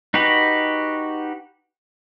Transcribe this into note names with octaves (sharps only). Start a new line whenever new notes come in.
D#4 F#4 G4 B4